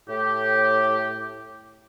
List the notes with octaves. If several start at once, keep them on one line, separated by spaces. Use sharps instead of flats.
A2 G4